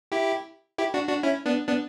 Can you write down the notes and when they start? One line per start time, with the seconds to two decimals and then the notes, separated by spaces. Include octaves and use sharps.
0.12 E4 G4
0.78 E4 G4
0.94 D4 F#4
1.09 D4 F#4
1.23 C#4 E4
1.46 B3 D4
1.67 B3 D4